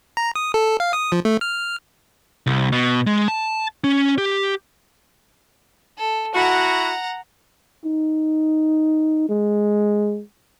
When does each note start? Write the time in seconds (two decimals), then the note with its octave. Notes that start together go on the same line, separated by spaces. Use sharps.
0.17 A#5
0.35 D#6
0.54 A4
0.80 F5
0.93 D#6
1.12 F3
1.25 A3
1.41 F6
2.47 C2
2.72 B2
3.07 G#3
3.28 A5
3.84 C#4
4.18 G4
5.98 A4
6.35 E4 F#4 F#5 A#5
7.85 D#4
9.29 G#3